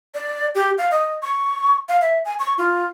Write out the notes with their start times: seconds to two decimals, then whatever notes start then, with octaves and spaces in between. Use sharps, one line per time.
0.14 D5
0.55 G4
0.78 F5
0.91 D#5
1.23 C#6
1.89 F5
2.02 E5
2.25 G#5
2.39 C#6
2.58 F4